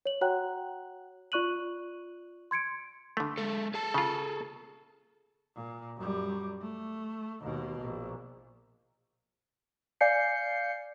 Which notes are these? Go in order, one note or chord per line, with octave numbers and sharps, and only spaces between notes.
C#5 F#7
F#4 C#5 F#5 G5 A#5 F#6
F4 D5 C#6 F#6 D#7 F#7
C6 G#6 C#7 D7
D3 A3
G#3 A4
G#4 A4 A5
C#3 F4
A#2
F#2 G3
A3
D#2 B2
A#1
D5 F5 G#5 G6 C7 C#7